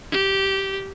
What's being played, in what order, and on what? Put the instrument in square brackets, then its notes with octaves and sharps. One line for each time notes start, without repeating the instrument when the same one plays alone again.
[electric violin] G4